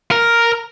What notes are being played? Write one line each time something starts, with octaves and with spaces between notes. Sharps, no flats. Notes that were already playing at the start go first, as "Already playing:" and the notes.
A#4